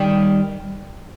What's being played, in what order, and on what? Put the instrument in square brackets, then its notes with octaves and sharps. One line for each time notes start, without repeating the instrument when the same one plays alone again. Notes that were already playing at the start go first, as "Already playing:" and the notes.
Already playing: [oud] D#3 G3